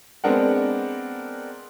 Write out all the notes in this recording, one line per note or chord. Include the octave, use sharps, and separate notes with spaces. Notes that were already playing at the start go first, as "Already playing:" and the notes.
G#3 B3 C4 D4 A#4 F#5